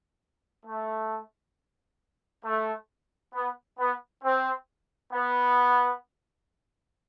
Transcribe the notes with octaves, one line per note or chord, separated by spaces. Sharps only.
A3
A3
B3
B3
C4
B3